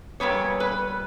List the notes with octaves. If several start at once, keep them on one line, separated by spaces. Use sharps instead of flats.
A#2 G3 B3 C#5
B4